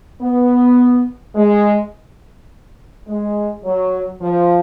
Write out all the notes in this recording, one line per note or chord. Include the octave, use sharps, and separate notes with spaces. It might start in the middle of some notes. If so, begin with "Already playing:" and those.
B3
G#3
G#3
F#3
F3